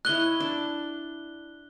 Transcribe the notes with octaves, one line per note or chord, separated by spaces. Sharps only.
E4 C#5 D#5 F#6 G7
D4